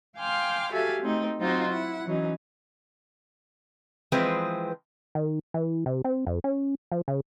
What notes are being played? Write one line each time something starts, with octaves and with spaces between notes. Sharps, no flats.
F5 G5 G#5 C6 D6 F6
F#4 G4 A4 E5 F5 G#5
A3 C4 D#4
F#3 C4 D#4 F4 F#4
E4 F#5
E3 F#3 C#4 D#4
E3 F3 G#3 C4 G#4 B4
D#3
E3
C3
C4
F2
C#4
F3
C#3